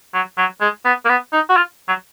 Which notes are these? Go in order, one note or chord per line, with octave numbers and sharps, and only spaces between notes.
F#3
F#3
G#3
B3
A#3
B3
D#4
F#4
F4
F#3